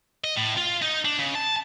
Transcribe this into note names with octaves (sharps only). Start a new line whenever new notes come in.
D#5
A2
F4
D#4
D4
C#3
A5